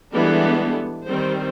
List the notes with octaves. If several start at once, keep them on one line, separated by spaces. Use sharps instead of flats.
E3 G3 G#3 B3 D4 A4
D#3 G3 C4 C5